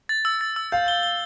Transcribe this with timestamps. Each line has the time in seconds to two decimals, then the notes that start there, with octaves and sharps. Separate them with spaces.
0.09 A6
0.25 E6
0.41 A6
0.56 E6
0.72 F5 G6
0.88 G7
1.03 G7